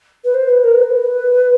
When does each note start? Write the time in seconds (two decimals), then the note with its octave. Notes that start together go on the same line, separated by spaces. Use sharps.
0.24 B4
0.34 C5
0.49 B4
0.64 A#4
0.78 C5
0.83 B4